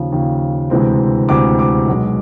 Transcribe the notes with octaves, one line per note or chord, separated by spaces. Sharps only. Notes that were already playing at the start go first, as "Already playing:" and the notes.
Already playing: D#2 C#3 F3
D#2 C#3 F3
D2 C3 E3 G#3 C4
D2 C3 E3 G#3 C4 D6
D6
B1 B2 G#3